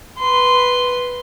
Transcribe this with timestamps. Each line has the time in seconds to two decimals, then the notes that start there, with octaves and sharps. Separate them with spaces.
0.19 B4 C6